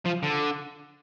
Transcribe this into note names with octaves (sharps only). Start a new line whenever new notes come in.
F3
D3